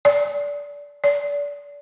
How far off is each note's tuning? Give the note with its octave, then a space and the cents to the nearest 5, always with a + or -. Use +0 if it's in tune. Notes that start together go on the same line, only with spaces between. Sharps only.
D5 -20
D5 -30